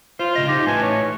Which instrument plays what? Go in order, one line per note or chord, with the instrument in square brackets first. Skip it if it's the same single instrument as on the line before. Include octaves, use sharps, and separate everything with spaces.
[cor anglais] F4 [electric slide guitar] C5
[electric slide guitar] A2 C#3 D#5
[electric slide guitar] D#4 [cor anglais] G4
[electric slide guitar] A2 B4 A5 [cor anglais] G#5
[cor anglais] C#5